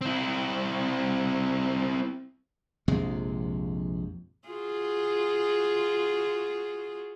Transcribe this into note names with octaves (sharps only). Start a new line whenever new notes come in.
C4 E4
A#1 F2 C3 G#3
F4 F#4 G#4